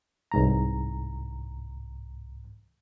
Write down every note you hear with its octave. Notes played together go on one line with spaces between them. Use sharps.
C2 G#2 A#5